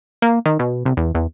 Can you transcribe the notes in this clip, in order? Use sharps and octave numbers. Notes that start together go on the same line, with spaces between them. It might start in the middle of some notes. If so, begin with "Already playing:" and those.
A#3
D#3
B2
C2
E2
E2